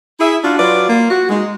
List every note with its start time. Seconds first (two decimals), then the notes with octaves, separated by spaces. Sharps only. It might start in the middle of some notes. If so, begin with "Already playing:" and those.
0.20 E4 G#4 E5
0.43 D4 F4 F#4
0.58 F#3 F4 B4 D5
0.89 A#3 F4
1.10 F#4
1.29 G#3 D#4